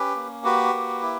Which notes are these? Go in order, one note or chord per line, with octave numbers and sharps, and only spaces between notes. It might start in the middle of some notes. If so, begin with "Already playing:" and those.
Already playing: C#4 G4 B4
A#3
F#4 G4 B4
A#3
E4